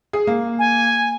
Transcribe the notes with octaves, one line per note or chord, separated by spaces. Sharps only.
G#4
A#3
G#5